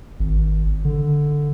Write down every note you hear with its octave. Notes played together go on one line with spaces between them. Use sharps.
G#1
D3